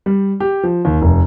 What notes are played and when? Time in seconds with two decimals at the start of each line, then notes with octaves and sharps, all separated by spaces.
0.06 G3
0.40 G4
0.63 F3
0.85 D#2
1.02 F1